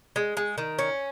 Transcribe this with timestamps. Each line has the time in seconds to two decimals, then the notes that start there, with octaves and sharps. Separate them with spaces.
0.16 G#3
0.37 G#3
0.58 D#3
0.79 C#4